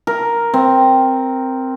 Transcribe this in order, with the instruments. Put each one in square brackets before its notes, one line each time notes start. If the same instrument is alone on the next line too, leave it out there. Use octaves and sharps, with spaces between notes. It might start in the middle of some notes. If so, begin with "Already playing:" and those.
[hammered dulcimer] A#4
C4